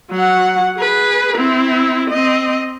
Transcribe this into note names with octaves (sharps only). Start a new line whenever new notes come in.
F#3 F#5
G#4 B4
C4 E4
C4 D#5